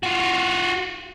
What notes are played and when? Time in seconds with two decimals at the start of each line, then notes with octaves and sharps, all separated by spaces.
0.03 F4 F#4